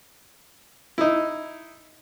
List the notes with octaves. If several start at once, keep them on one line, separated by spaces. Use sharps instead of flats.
D#4 E4